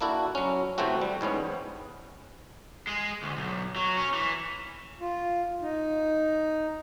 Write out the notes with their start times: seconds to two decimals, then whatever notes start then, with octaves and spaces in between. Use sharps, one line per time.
0.01 A#3 D4 E4 F#4 A4
0.35 F#3 C#4
0.78 A2 C3 E3 A3 C4 F#4
1.01 G3
1.21 E2 G#2 B3 C#4
2.87 G#3 G#4
3.23 D2
3.37 B1
3.76 F#3
3.98 C#4
4.14 E3
5.00 F4
5.62 D#4